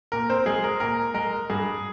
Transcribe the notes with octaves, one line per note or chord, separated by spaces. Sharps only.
A#2 A#4
C4 C5
G#3 G#4
A#4
A#2 A#4
G#3 A#4
G2 G#4